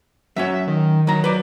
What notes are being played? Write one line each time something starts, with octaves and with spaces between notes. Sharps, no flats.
F#3 C#4 C#5 E5
D#3
D#3 F#3 A#5
B4 D5